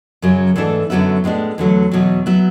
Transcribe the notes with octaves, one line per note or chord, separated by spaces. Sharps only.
F#2 C#3 F#3
G#2 E3 A3 D4 A4
F#2 D3 F#3 B3 E4
A2 G#3 B3 D4
E2 D3 F#3 A3
E2 B2 F#3
F#3 B3 E4